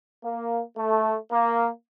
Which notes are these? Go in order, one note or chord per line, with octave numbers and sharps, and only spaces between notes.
A#3
A3
A#3